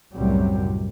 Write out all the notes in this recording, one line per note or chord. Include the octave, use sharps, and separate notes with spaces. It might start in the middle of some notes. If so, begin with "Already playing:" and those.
C2 F#2 A2 C3 F#3 G3